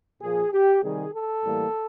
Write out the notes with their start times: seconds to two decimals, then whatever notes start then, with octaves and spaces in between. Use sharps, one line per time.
0.22 A#2 F3 A#3 G#4
0.53 G4
0.83 C3 D#3 G3 G#4
1.14 A4
1.44 A2 E3 G3 A#3